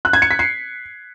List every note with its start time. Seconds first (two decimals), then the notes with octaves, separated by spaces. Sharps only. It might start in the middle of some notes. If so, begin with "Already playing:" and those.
0.05 F#6
0.13 G#6
0.22 C#7
0.31 B6
0.39 C7